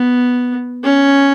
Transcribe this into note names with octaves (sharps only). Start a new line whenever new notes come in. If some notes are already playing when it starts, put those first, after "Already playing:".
Already playing: B3
C#4